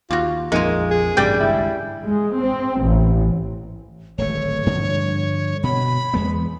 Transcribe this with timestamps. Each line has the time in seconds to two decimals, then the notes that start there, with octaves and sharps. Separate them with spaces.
0.11 D#2 G3 F4 F#4
0.52 A#1 F2 G#3 A#3 D#4 F4
0.90 G#4
1.17 A1 G2 C3 G3 D5 G5
1.40 G#1 C#2 G2 E4
2.06 G#3
2.38 C4
2.84 A1
4.18 D1 G#1 A3 C#5
4.66 G2 D3 F3
5.63 B2 B5
6.14 E2 G#3 B3